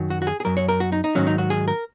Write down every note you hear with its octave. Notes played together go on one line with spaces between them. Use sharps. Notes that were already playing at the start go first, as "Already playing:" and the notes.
Already playing: F#2 D#3 F#3
F#4
F#4
G#4
G#4
F#2 F#3 A#4
C#5
A#4
F#4
D#4
D#4
G#2 D#3 F#3 C#4
D#4
F#4
G#4
A#4